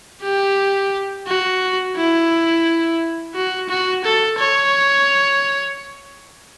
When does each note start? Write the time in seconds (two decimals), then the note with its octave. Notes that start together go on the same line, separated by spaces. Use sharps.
0.22 G4
1.27 F#4
1.96 E4
3.35 F#4
3.69 F#4
4.04 A4
4.39 C#5